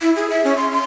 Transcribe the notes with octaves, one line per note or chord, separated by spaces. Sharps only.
E4
G#4
E5
C#4
C6
C6